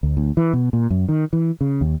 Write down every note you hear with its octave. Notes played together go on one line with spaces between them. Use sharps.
D2
D2
E3
B2
A#2
F#2
D#3
E3
C#3
D#2